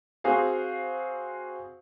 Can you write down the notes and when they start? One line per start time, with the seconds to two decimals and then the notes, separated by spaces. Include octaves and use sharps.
0.24 C4 F#4 G#4 C5 F5